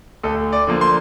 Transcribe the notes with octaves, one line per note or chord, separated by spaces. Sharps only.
D2 A4
D5
D3 F3 A#3
C6